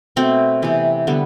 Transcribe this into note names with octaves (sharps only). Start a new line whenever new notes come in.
B2 A3 C4
C3 E3 B3
D3 G3 B3